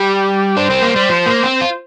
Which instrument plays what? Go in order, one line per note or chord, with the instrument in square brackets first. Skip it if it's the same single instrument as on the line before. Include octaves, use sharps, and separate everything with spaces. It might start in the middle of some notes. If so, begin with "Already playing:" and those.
Already playing: [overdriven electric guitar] G3 [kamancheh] G4
[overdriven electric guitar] D4 [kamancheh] C5
[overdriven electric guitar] C4
A#3
G3
F3
A#3
C4
F4